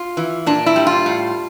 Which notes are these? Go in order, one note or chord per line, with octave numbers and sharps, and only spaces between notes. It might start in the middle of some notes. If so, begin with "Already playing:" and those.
Already playing: F4
E3
A#2 D4
E4
G3
F4
A2